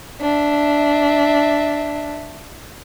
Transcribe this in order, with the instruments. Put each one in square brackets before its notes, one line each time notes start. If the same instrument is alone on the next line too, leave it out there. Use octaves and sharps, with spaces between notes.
[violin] D4 E5